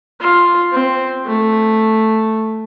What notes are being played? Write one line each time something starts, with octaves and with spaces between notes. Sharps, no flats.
F4
C4
A3